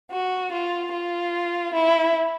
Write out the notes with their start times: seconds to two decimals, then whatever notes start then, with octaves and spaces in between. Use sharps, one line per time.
0.11 F#4
0.51 F4
0.92 F4
1.73 E4